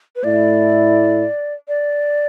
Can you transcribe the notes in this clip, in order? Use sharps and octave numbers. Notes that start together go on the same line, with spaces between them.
B4
A2 A3 E4 D5
D5